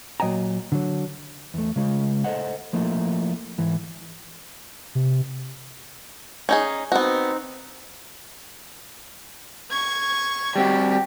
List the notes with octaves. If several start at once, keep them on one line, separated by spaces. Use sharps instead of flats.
A#2 F#3 D#5 G5 G#5 A#5
D3 F#3
E2 A3
C#3 G#3 F4
A4 C5 D#5 F#5
F3 A3 A#3 E4
G#2 E3
C3
C#4 D#4 G#4
B3 C4 D#4 F#4
C#6 G#6
G3 C4 F#4 G4